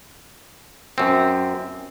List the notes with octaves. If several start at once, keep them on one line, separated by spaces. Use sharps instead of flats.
F#2 C4